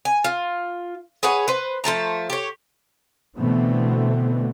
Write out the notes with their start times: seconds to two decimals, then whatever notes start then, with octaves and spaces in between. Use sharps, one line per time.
0.05 G#5
0.24 F4
1.23 G#4 B4 C#5 F#5
1.48 B4 C5
1.84 F3 A3 A5 A#5
2.30 G4 C#5
3.38 B2 D3 E3 A3 B3 C4